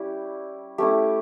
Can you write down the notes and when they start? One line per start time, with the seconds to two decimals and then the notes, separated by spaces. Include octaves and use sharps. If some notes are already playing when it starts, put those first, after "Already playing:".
Already playing: G3 C#4 E4 G4
0.78 A3 C#4 E4 G4